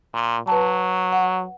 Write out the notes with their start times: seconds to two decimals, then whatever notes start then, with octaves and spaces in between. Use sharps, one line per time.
0.14 A#2
0.47 F#3 B4 A5
1.12 F#5